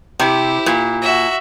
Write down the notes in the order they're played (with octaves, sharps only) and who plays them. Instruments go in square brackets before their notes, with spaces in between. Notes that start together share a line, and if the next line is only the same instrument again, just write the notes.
[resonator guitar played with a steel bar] C3 [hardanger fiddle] E4 G4
[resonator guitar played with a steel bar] A#2
[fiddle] F#4 E5